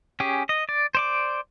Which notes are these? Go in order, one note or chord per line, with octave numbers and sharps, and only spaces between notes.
C#4 G4 G#4
D#5
D5
C5 D5 D6